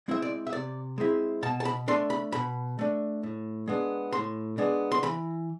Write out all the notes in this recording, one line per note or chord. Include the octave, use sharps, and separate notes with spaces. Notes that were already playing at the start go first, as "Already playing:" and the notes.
G#3 C4 E4 E5
D5
E5
C3 D5
G#3 C4 E4
B2 A5
A5
B5
A3 D4 C6
B5
B2 B5
A3 D4
A2
G#3 B3 D4
A2 C6
G#3 B3 D4
C6
E3 B5